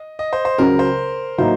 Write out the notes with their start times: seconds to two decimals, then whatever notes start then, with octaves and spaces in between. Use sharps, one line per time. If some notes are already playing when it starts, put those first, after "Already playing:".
Already playing: D#5
0.19 D#5
0.33 C5
0.45 C5
0.58 C#2 C#3 F#3 A#4
0.79 C5
1.38 A2 F#3 A#3 D#4 C5